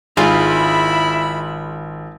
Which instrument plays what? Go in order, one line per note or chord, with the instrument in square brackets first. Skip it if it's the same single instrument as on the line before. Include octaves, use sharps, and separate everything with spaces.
[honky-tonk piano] G#1 [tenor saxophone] E4 [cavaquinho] F4 G#4 F5 [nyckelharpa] B5